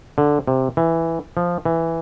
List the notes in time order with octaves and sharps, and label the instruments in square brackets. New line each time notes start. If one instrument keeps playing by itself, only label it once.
[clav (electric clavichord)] D3
C3
E3
F3
E3